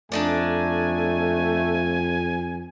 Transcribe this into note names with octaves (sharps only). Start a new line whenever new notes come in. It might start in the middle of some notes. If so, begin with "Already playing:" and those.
F2 A3 D4 D#4 D5 G#5